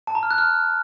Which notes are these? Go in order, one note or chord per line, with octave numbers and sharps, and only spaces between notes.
A5
A#5
F6
F#6
F6